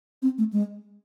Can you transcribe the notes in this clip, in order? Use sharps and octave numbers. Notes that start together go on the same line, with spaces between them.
C4
A3
G#3